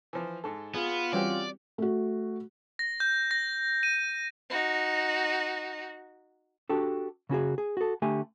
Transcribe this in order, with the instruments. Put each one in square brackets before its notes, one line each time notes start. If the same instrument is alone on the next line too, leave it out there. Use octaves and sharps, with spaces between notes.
[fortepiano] E3 F3
G#2 A4
[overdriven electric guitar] B3 [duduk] F4 [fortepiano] G#4
[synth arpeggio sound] E3 G3 C4 [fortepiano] C#4 F#4 G4 [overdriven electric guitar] D5
[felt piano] A3 F#4
[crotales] A#6
G6
A#6
D#7
[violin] D#4 F#4
[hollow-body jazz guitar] D4 F#4 G4 A4
C#3 C#4 F#4 G#4
G#4
F#4 A4
D3 A3 G4 G#5